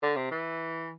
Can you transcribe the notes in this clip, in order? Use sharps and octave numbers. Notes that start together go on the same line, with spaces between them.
D3
C3
E3